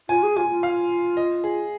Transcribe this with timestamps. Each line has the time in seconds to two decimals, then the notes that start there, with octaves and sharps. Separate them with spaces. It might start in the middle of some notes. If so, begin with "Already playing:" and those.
0.09 F4 G#5
0.23 G#4
0.37 F4 G#5
0.50 F4
0.63 F5
1.17 D#5
1.44 G#4